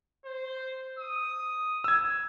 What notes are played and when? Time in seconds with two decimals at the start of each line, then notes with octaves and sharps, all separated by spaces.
0.25 C5
0.99 D#6
1.84 E6 G#6